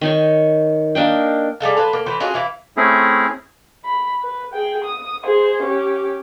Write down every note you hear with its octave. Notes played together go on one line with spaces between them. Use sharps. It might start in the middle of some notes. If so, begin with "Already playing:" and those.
D#3 D#4 C#5
A#3 D4 D#4 G5
G3 G#4 A4 F5
B4 C5 F5
A#3
E3 B4 C5
C#4 F4 F#4 G#4
E3 E4 F5
A3 C4 C#4 E4 G#4
B5
B4
G#4 G5
D#6
G#4 C5
C#4 G4